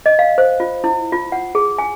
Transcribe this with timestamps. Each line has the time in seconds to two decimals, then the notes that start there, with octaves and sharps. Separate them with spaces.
0.06 D#5
0.19 F5
0.38 C5
0.60 F4
0.84 E4
1.12 F4
1.32 F#5
1.55 G#4
1.78 G#5